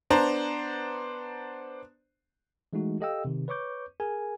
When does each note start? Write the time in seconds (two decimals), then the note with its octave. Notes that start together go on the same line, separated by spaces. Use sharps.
0.10 B3 D4 C5 A#5
2.73 E3 G#3 A3 D#4 F#4
3.00 G4 A4 D#5 F5 G5 E6
3.25 C3 D#3
3.48 B4 C#5 C#6 D6 G6
4.00 G#4 A#4 G#5